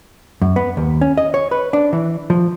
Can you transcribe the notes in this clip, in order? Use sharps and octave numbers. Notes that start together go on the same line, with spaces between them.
F#2
B3
D#2
C#4
D#5
C#5
B4
D4
E3
F3